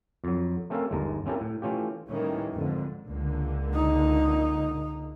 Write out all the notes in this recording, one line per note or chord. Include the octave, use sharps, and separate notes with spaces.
F2 F#3
A3 C4 C#4 A4 A#4 F5
G1 D#2 G#3 A5 A#5
C4 C#4 E4 G4 A4 A#4
A2
E3 A3 C#4 F4 G4
A2 D#3 E3 G3 A#3 C#4
F2 G#2 D3
C#2 D3 A#3
D#4